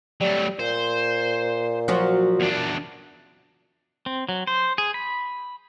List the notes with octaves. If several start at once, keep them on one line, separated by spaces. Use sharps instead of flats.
F#3 G3 A3
A#2 C5
F3 F#3 F#4
E2 D4
C4
F#3
C5
G#4
B5